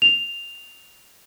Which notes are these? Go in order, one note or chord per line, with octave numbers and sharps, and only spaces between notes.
F7